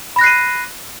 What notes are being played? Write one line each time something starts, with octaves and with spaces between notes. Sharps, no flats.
B5 F#6 A#6 C7 D#7